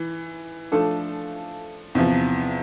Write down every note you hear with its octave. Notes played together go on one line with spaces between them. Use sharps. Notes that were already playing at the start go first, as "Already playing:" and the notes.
Already playing: E3
F3 A3 D4 A4
E2 C3 F3